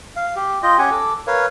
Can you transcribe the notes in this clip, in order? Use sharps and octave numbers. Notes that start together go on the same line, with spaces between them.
F5
G4
F4 D#5 G5
C#4 G4 F#5 G#5
A4 D6
A#4 B4 C#5 F5